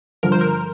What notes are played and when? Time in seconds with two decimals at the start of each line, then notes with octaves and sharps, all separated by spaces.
0.23 G2 D3 F3 A#4
0.32 C5
0.41 A#4